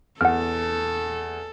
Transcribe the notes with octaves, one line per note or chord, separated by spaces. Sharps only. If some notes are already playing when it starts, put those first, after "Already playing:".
E2 A4 F#5 F6